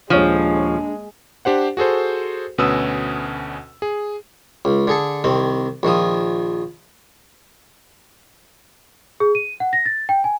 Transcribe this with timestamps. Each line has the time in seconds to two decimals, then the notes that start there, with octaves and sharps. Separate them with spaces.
0.10 D#1 F3 G#3 D4 C#5 D#7
1.45 D4 G4 C5 F#5
1.77 F#4 G#4 A4 C5
2.58 D2 B2 C#4 B4 D#6 E6
3.82 G#4
4.65 C#2
4.87 D3 G#4 A4
5.24 C2 D#3 C4
5.83 A#1 D#3 F3 D#6
9.20 G#4
9.35 D#7
9.60 F#5
9.73 A#6
9.86 A6
10.09 G5
10.24 G#5